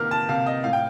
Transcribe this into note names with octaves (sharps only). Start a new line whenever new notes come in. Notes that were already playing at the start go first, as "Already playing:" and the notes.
Already playing: C3 D#3 A#3 F6
A5
C3 F5
D#5
A2 F5
G5